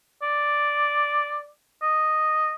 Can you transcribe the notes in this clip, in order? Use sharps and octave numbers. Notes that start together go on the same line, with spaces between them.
D5
D#5